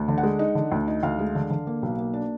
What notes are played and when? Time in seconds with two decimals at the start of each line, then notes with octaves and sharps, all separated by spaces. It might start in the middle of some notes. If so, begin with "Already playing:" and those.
Already playing: D2
0.08 D3
0.18 F#5
0.23 G#3
0.39 D#4
0.55 D3
0.72 D2
0.88 D#4
1.03 D2 F5
1.19 G#3
1.35 D3
1.50 D3
1.67 A#3
1.82 B1
1.98 A#3
2.13 D4